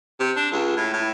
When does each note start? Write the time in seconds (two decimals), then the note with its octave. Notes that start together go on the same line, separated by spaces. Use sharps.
0.20 C3
0.36 D4
0.52 C#2
0.77 A2
0.93 A2